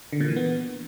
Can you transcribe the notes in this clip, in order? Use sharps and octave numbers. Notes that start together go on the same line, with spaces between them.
D3
A#2
E3
B3